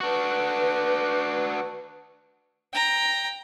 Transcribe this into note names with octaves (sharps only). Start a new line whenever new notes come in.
D4 F#4 B4
G5 A#5